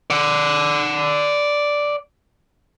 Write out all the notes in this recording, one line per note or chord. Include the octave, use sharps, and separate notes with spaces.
D5 F#5